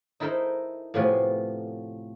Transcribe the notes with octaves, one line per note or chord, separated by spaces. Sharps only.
D#4 E4 A4 A#4 C5 D#5
A2 C3 F3 B3 F4 G#5